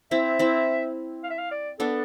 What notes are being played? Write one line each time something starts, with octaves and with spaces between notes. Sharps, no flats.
C4 E4 E5
C4 E4
F5
E5
F5
D5
B3 D4 A4